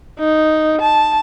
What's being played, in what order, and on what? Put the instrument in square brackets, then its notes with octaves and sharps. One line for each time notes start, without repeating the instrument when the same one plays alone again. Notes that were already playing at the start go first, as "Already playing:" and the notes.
[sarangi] D#4
A5